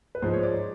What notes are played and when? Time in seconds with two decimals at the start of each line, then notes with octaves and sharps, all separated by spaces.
0.15 B4
0.22 G#2 F3 G#3 C5
0.33 C#5
0.43 D5